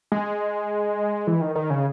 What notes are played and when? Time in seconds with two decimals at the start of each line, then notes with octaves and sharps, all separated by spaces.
0.12 G#3
1.27 E3
1.41 D#3
1.55 D#3
1.70 C#3